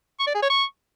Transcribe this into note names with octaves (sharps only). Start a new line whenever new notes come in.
C#6
D5
G#4
C#5
C#6